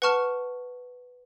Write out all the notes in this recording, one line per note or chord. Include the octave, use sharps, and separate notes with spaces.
B4 F#5 A5 C#6 F6